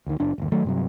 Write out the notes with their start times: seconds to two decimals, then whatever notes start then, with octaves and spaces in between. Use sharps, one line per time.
0.06 D2 D#3
0.20 F#1 D4
0.38 G1 D#2
0.52 D#3 F#3 A3
0.64 G2 C3 F#3